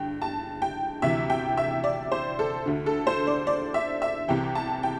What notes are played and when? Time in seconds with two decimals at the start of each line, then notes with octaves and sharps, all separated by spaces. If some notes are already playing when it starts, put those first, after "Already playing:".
Already playing: G2 D3 G5
0.22 A5
0.62 G5
1.02 D2 C3 E3 E5
1.30 G5
1.57 E5
1.84 D5
2.12 C5
2.39 A4
2.66 D2 D3
2.86 A4
3.07 C5
3.27 D5
3.47 D5
3.74 E5
4.02 E5
4.28 C2 C3 E3 G5
4.55 A5
4.83 G5